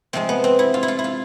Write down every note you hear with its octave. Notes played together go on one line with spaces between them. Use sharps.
C3 F3 G#3 C4
B3
C4
E4
F4
E4
F4
E4
F4